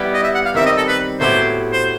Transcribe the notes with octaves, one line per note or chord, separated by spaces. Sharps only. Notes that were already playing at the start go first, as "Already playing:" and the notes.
Already playing: G3 B3 E4 G4
D#5
E5
F#5
F5
D#3 G3 C4 E5
D#5
A4
B4
A2 F#3 B3 E4 G4 C5
C5